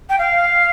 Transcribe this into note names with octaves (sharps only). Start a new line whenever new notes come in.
G5
F5